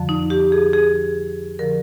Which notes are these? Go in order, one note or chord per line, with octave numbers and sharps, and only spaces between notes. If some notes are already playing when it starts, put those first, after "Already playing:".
Already playing: F2 D3 F3
D#4
G4
G#4
G#4
D3 F3 A#4